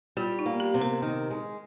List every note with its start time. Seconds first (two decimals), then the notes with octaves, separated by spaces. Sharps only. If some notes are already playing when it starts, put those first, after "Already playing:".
0.17 G3 F4
0.39 D#4
0.46 A#3
0.60 G4
0.74 C3
0.82 A#4
1.02 D#3
1.30 G#3